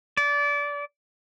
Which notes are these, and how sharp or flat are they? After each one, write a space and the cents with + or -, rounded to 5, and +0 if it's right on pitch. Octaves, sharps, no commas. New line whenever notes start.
D5 -25